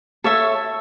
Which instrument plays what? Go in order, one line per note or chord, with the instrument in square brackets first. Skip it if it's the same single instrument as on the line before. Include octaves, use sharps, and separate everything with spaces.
[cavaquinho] A4 C#5 E5